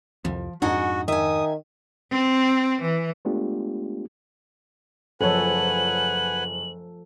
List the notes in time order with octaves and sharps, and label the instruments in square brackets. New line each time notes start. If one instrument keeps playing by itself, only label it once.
[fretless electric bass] C2 F2 [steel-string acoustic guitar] F3
[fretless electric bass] F2 G#2 D4 [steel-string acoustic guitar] D#4 F#5 G#5 [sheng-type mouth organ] F#4
[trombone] D#3 [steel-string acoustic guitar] E5 G#5 [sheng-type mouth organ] D#6
[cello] C4
E3
[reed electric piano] G#3 A3 B3 D4 F4 G4
[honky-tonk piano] F#1 C#5 [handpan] F3 A4 [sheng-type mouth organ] B4 F#5 G#5 [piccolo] F#7